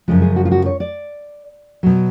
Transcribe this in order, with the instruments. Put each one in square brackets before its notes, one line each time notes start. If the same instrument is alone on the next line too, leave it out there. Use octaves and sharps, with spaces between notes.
[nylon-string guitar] F#2 C#3 F3 G#3
G#4
F#4
F4
F#4
C#5
D5
B2 F#3